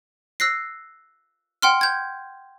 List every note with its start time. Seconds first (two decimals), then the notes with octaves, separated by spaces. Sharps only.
0.40 E6 F#6 A#6 C7
1.62 F#5 G5 C6 F6
1.81 G6 G#6